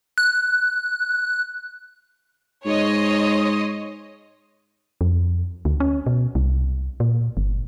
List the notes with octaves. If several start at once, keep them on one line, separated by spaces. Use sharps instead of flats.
F#6
G#2 C#5 D#5 C6
F2
D2
C#4
B2
C2
A#2
G1